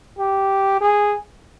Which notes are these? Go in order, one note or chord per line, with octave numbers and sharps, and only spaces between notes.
G4
G#4